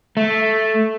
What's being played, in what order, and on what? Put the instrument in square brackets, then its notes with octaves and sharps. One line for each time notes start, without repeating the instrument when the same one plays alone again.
[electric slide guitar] A3